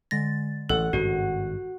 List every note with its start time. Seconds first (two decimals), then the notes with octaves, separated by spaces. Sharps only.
0.11 D3 G#3 A6 A#6
0.69 A1 A4 F#5 F#6
0.93 G#1 G2 C#3 F#4